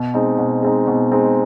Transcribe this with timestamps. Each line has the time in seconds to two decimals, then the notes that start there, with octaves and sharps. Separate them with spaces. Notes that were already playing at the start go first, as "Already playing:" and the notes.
Already playing: B2
0.14 G#3 C4 D#4
0.38 B2
0.62 G#3 C4 D#4
0.87 B2
1.12 G#3 C4 D#4